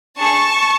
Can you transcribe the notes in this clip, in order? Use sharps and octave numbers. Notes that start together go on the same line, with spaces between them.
D4 G#4 A5 C#6